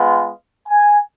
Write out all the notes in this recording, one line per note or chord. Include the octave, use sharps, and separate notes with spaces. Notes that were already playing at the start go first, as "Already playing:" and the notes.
Already playing: G#3 B3 F4
G#5